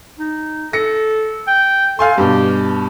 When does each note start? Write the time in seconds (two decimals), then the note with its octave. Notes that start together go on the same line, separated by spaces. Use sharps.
0.19 D#4
0.73 A4 A#6 C#7
1.48 G5
1.99 A4 F5 G#5 C6
2.18 G2 B2 G4